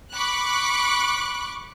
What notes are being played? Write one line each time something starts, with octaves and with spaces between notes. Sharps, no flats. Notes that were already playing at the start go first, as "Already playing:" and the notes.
B5 C#6 D6 F#6